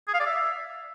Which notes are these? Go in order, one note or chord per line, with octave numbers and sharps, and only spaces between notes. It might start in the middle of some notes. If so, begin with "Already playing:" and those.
G#4
F5
D5
E5